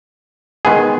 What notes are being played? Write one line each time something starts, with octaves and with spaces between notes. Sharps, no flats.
D#3 G#3 B3 E4 G#4